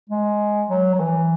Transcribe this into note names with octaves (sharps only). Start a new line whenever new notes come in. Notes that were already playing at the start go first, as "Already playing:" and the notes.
G#3
F#3
F#3
E3